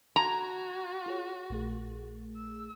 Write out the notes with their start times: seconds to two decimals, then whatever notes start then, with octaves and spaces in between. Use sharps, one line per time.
0.16 F#4 A#5 C#6 G#6
1.06 F4 G#4 C#5
1.50 A#1 A3 G#4
2.36 E6